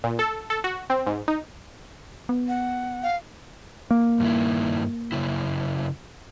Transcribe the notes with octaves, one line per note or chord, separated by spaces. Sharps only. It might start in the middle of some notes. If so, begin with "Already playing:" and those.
A#2
A4
A4
F#4
C4
G#2
D#4
B3
F#5
F5
A#3
G2 D#3 E4
F#2 C#3 E4